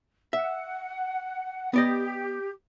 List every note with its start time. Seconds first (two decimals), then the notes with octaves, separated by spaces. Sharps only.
0.33 E5 F#5
1.74 B3 G4 D5 D#5